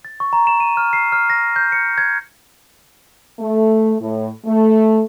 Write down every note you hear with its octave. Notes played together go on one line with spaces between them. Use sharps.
A6
C#6
A#5
E7
D#7
F6
C7
F6
A#6
G6
C#7
G#6
A3
A2
A3